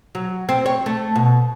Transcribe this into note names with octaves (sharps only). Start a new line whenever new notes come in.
F#3
C4
C#5
A3
B2